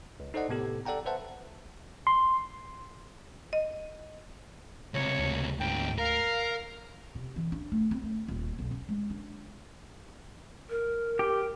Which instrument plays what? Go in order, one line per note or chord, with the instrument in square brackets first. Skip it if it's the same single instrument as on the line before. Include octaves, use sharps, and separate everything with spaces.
[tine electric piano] C#2
D#4 A4 C5 D5 D#5 F#5
A2 C3 B3 G4 A4
A4 D5 F#5 G5 A#5
B4 C5 E5 F#5 A5
C6
[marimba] D#5
[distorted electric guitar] C#2 C3 [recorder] C#5
[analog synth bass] D2
[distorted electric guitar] G#2 D3 [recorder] G5
[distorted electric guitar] A#4 [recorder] F5
[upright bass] C3
E3
D4
A3
C4
A3
D#1
B1
C#4
G#3
D4
[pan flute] A#4
[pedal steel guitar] G4